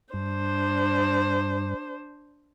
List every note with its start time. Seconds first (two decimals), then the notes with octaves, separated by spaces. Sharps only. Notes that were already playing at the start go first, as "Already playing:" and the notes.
0.14 G2 D4 C5